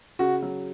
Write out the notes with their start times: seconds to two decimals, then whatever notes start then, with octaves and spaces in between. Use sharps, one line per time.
0.19 C#3 F#4
0.42 F#3